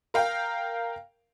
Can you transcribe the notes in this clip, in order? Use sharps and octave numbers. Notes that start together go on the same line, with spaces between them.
A#4 F5 G5